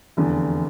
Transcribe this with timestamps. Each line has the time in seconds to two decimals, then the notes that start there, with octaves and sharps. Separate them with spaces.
0.17 F1 E2 D3